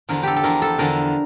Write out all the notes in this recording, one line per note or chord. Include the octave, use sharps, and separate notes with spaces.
E2 D3 F3 A#4
G4 A4
A4
E2 D3 F3 A#4
A4
E2 D3 F3 A#4